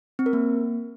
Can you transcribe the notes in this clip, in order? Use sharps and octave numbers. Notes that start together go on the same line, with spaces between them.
C4
A#4
A#3